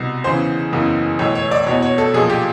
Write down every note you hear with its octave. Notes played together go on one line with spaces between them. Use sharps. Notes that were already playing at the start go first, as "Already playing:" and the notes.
Already playing: C2 B2
E2 C#3 E3 C5
F#1 E2 C#3 E3
B1 A2 E3 C#5
C#5
D5
E2 B2 C#5
C#5
A4
B1 A#2 F3 G#4
G4